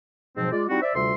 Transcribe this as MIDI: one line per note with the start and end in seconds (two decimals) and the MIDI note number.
0.37 0.50 44
0.37 0.50 47
0.37 0.50 53
0.37 0.50 54
0.37 0.50 60
0.52 0.64 56
0.52 0.64 65
0.52 0.64 74
0.69 0.79 55
0.69 0.79 60
0.69 0.79 63
0.69 0.79 64
0.69 0.79 66
0.82 0.92 72
0.82 0.92 74
0.82 0.92 76
0.95 1.14 38
0.95 1.14 48
0.95 1.14 55
0.95 1.14 65
0.95 1.14 76
0.95 1.14 84